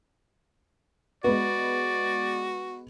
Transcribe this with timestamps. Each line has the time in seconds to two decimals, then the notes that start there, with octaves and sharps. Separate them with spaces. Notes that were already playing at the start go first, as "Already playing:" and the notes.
1.24 G#3 B3 F#4 D5